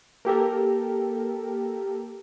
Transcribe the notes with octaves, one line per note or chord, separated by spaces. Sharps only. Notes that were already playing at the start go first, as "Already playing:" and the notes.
A#3 G4 A4 A#4